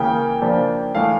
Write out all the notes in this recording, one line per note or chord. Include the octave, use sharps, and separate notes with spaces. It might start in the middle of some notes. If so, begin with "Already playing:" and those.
Already playing: C#3 E3 A#3 G5
C#3 F3 A#3 D4
A2 E3 A3 F5